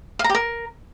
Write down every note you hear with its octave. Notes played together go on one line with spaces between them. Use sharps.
F5
A#5
G4
A#4